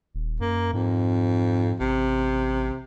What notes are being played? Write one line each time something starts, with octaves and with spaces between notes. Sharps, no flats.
D#1
F#2 A#3
F2 G#2
A1 C3